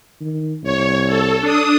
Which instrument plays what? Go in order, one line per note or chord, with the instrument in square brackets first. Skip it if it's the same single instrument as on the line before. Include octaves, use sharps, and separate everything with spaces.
[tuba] D#3
[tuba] C2 [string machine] C#5
[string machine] A4
D4 D#6